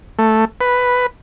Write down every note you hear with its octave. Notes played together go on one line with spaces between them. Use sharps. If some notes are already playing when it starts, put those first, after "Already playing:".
A3
B4